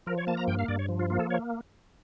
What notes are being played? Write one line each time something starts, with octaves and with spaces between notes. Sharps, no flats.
F3 A#4
C#5
A#3 A5
A#5
G2 G5
F5
G2 D5
C#5
F3
F4
A#3 F4
A4
C#5